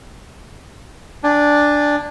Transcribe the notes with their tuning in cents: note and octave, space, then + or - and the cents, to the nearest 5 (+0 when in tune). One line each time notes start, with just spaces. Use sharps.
D4 +0 G#5 -30